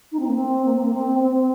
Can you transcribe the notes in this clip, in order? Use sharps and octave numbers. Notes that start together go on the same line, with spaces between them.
D#4
C4
A#3
C4
A#3
C4
A#3
C4
C4